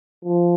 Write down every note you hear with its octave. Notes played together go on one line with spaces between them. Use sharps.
F3